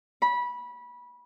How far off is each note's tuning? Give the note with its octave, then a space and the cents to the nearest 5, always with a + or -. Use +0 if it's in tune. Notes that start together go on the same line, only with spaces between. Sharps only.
B5 -20